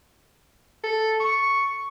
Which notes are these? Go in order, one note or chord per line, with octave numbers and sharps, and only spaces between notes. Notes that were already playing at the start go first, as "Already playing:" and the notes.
A4
C#6